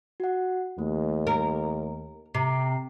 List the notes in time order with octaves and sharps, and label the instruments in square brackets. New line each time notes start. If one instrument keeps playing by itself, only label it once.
[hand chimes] F#4 F#5
[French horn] D#2 [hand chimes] A3
[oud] A#4
[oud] C3 [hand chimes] A#5 C7